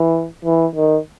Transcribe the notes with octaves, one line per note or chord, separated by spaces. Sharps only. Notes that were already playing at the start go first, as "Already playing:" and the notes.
Already playing: E3
E3
D#3